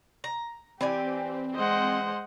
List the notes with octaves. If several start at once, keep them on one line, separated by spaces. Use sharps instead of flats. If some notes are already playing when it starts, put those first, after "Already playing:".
A#5
E3 C4 G4 D5 G#5
G#3 C5 D#5 F#5